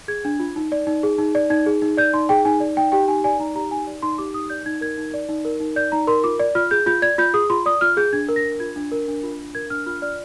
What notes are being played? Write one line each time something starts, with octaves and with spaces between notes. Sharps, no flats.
G#4 G#6
D4
F4
D#4
D5
D#4
G#4
D#4
D5
D#4 G#6
G#4
D#4
D5 G6
D#4 C6
G#4 G5
D#4 G#5
D5
D#4 G5
G4 G5
D#4 G#5
D5 G#5
D#4 A#5
G4 A#5
D#4 G#5
D5
D#4 C6
G4 D6
D#4 D#6
D5 G6
D#4 G#6
A#4 G#6
D#4
D5
D#4
A#4
D#4
D5 G6
D#4 A#5
A#4 C6
F4 D6
D5
F4 F6
G#4 G6
F4 G6
D5 G#6
F4 G6
G#4 D#6
F4 C6
D5 D#6
F4 F6
G#4 G6
D4 G#6
A#4
A#6
D4
F4 G#6
D4
A#4
D4
F4
D4
A#4 G#6
D4 F6
F4 F6
D5 F6